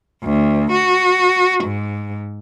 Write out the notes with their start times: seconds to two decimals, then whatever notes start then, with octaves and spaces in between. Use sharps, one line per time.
0.24 D2
0.72 F#4
1.64 G#2